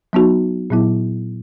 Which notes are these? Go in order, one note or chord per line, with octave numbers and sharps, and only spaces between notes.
F#3 B3 D#4 F#4
A#2 F#3 B3 E4